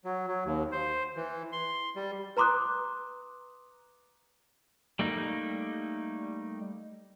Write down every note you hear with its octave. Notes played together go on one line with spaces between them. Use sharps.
F#3
F#3
D#2
C5
E3
C6
G3
B4 A#5 C6 D6 D#6 F#6
G3 A3 A#3 D#4